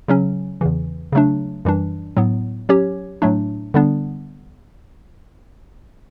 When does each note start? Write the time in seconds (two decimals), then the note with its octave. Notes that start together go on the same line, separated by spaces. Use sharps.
0.08 C#3 F#3 C#4
0.61 E2 C#3 E3
1.12 C#3 F#3 A3 D4
1.65 F#2 E3 G3 D4
2.17 A2 F#3 B3
2.69 F#3 C#4 G4 C#5
3.22 A2 F#3 A3 D4
3.74 D3 G3 B3 D4